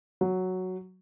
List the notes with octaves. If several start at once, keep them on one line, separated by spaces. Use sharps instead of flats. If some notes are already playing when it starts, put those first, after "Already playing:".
F#3